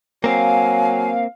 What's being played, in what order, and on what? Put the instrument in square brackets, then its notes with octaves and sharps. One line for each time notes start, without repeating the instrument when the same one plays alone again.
[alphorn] F#3 [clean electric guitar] A#3 C4 [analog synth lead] F5 [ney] G#5